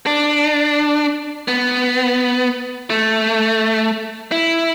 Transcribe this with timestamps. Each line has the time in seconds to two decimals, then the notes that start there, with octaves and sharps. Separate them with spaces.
0.06 D4
1.48 B3
2.90 A3
4.32 E4